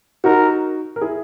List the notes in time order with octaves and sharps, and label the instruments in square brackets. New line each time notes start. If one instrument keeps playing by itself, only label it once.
[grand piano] D#4 F#4 [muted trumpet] A#4
[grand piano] A#4
E4 G#4